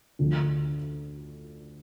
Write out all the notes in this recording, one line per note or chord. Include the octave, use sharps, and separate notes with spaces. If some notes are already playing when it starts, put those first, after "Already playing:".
D2 D3 F3